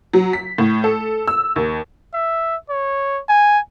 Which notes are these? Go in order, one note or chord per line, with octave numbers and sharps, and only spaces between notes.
F#3
B6
A2
A4
E6
D#2
E5
C#5
G#5